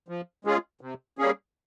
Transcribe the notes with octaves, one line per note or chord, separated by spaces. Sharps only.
F3
G#3 C#4 F4 G#4
C3
G3 A#3 C#4 G#4